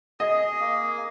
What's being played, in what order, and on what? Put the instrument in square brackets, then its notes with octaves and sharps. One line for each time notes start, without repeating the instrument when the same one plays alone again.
[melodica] G#4 [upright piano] D#5
[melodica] A#3